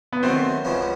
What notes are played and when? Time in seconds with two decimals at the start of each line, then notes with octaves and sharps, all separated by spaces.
0.12 B3
0.23 D#3 F#3 A3 C4
0.65 C#2 C#3 F3 G#3 B3